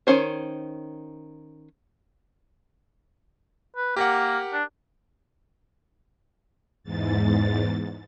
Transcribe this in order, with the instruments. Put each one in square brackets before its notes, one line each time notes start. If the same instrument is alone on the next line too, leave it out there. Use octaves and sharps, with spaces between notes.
[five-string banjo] D#3 C#4 C5 C#5
[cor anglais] B4
[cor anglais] A#3 [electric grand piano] G4 A#4 F#5
[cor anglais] D4
[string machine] E2 G#2 A6